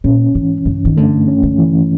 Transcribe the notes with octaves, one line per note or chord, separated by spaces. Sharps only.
A#2 C#4
G#2 E3
G2 C#3
D#3
D3 A3
C#4
D3
E3